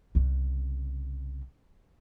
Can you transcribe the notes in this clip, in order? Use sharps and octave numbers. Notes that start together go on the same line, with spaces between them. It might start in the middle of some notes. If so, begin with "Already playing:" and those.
C2 C#3